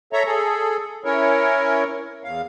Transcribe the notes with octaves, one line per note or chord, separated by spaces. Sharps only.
A4 C#5 E5 A#5
G#4 A4
C#4 E4 A#4 C#5
E2 F5